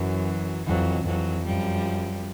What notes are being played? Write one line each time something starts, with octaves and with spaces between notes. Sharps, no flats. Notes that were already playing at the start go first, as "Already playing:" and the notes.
Already playing: F#2 E3 F#3
F2 E3 F#3
F2 E3 F#3
F#2 F3 G3